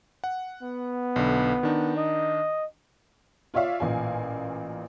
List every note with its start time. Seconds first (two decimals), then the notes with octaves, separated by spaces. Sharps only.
0.24 F#5
0.63 B3
1.16 B1 D3
1.63 D#3 D4 D#4
1.97 D#5
3.54 F4 C#5 D5 E5 F5
3.80 A1 A#2 F5 G#5